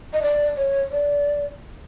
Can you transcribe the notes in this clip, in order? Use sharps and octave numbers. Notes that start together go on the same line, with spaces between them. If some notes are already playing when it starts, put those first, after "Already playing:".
D#5
D5
C#5
D5